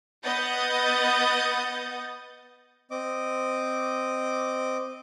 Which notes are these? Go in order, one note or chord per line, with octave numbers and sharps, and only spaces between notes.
B3 D#5 F#5 D#6 G6 A6
C4 D#5 D6